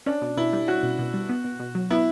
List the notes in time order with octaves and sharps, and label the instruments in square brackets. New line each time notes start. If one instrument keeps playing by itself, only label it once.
[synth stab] C#4 [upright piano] D4
[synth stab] B2
[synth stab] B2 [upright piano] E4
[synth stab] G3
[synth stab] C#4 [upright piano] F#4
[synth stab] B2
B2
G3
B3
B2
B2
F#3
[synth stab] B3 [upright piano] E4